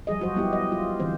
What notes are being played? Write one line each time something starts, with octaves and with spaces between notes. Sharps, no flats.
F3 G3 G#4 D#5
F#3 F#4 C5
G3 G#3 B3 E4 G4
D#5
F4
D3 E3 C4 C5